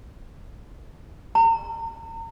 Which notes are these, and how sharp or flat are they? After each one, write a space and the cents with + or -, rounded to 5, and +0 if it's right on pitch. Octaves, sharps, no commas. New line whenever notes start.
A#5 -40